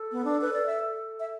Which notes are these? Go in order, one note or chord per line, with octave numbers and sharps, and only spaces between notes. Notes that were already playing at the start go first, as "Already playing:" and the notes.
Already playing: A4
B3
D4
B4
D5
E5
E5